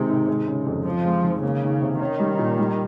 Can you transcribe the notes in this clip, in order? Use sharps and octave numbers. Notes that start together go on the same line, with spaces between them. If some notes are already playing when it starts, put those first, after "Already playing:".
Already playing: C3 D#3 G#3
G#2
G#3
C#3
F2
F3 C4
G#3
D#3
C#3 A#3
D#3
C3
D#3 C#4
G3
A#2
G3